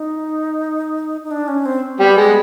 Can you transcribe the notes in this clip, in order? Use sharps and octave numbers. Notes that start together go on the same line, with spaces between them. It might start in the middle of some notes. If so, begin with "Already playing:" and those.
Already playing: D#4
D#4
D4
C#4
C4
G3 B3
G#3